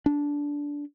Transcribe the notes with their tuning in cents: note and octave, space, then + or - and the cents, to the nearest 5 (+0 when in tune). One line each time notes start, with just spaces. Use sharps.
D4 -15